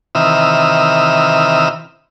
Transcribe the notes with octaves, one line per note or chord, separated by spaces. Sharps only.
C3 D#3 E3 E5 D#6 F6